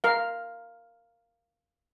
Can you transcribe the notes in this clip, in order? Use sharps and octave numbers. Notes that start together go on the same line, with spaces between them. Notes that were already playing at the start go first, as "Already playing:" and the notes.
A#4 F5